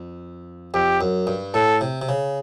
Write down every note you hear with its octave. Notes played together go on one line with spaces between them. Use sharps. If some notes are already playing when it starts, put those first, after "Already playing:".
Already playing: F2
F2 G4
F#2
G2
A2 A4
C3
C3
C#3